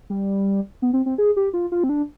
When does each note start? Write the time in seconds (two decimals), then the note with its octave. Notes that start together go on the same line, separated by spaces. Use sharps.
0.10 G3
0.82 B3
0.93 C4
1.06 C4
1.18 G#4
1.36 G4
1.54 F4
1.72 F4
1.84 C4
1.89 D4